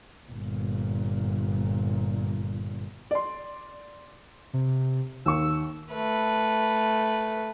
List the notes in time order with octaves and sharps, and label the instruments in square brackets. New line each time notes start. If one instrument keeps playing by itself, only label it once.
[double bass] G1 A#2
[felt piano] D5 C6
[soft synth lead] C3
[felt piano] D#2 C#6 [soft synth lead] E6
[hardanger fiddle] A3 B4